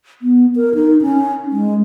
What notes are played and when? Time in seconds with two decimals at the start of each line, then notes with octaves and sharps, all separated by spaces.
0.22 B3
0.56 A#4
0.74 D#4
1.02 C#4
1.52 G#3